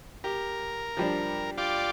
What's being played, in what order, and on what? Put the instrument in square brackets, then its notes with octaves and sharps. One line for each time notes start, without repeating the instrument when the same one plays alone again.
[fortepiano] G4 [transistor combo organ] A#4
[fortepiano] F3 G3 D4
[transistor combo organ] F4 G4 D5